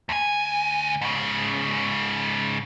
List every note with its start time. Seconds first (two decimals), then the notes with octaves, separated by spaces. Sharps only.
0.09 D2 G#5
1.01 G#2 C#3